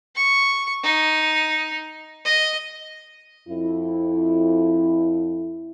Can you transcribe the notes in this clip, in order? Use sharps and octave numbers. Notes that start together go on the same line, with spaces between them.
C#6
D#4
D#5
F2 E4